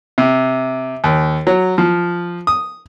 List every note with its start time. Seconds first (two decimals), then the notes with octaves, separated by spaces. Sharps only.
0.18 C3
1.04 D#2
1.47 F#3
1.78 F3
2.47 D#6